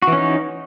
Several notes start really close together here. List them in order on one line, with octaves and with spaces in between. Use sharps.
F#4 E3 C#4 D#4